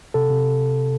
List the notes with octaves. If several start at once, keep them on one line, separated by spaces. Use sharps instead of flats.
C3 A4
C3